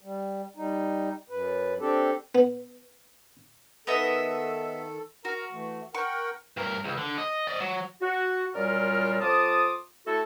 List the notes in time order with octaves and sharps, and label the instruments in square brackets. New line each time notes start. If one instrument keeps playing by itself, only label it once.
[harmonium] G3
G3 D#4
F#2 B4
C4 D4 G4 A4
[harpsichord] B3
[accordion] D#3 A4 [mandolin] B3 D#5 E5
[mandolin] F#4 [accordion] A#4 A#5
[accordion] E3 A3
[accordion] A#4 F#5 G5 [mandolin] C#6
[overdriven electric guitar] G2 A#4
C#2
D3
D#5
D5 D#5
F#3
[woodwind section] F#4
F#2 A#2 G3 F4 A#4 D5
F2 F4 A5 D6 D#6
A3 E4 F#4 A4